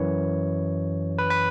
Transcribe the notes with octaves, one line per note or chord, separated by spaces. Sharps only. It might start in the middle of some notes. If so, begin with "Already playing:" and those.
Already playing: F#2 E3 C#5
B4
B4